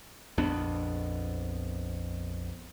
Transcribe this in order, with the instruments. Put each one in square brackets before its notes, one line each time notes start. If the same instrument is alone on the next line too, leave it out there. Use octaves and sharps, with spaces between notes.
[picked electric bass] A#1 F2 B3 D4